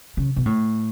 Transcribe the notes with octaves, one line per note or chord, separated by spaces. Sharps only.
C#3
B2
A2